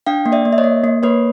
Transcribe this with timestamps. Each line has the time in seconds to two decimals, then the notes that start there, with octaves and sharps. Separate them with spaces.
0.06 D4 F5 G5
0.26 A#3
0.32 D5 E5
0.45 A#3
0.53 E5
0.58 C#5 D#5
0.64 A#3
0.84 A#3
1.03 A#3 B4 C#5